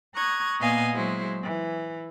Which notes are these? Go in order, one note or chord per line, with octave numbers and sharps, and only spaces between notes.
A#5 C#6 D#6 F#6 G#6
A#2 B3 D#5 F5 G#5
F#3 G#3 E4 C5
E3